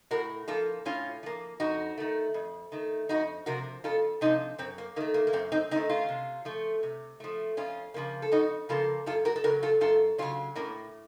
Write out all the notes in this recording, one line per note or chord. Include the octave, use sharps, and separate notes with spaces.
A2 F#4 A#4
F3 A#3 F4 A4
A2 C#4 F4
F3 A#3
F2 D#4 F#4
D#3 A3
F2
D#3 A3
F2 D#4 F#4
C3 F3 F#4 A#4
F2 F4 A4
C3 F3 C4 D#4
F#2 C4
A#3
D#3 A3 A#3
A#3
A#3
F#2 C4
C4 D#4
D#3 A3 C4 D#4
C#4 F4
C3
F3 A3
C3
F3 A3
F2 C#4 F4
C#3 F3 A#3
A4
F2 D#4 F#4
C#3 F3 A#3 F4 A4
F#2 F4 A4
F#4 A#4
A4
C#3 F#3 F#4 A#4
F4 A4
F#2 F4 A4
C#3 F#3 C#4 F4
A2 A#3 C#4